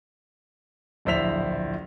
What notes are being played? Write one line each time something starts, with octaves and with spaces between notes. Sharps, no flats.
D1 A#1 E4 C5 B6 F7